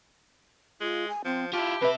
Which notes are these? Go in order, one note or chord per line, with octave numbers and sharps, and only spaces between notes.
G#3 F4
G#5
F3 C4
E4 F4 G4 A5
C3 B4 E5